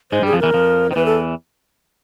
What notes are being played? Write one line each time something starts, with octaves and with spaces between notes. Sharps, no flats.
G#2 G#3 C5
G2 G3 G#4
F2 F3
E2 E3 A#4
F2 F3
D#3 C5
E2 E3 B4
A4